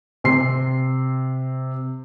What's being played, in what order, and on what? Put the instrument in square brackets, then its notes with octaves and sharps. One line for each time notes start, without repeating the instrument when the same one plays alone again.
[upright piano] C3 C6 C7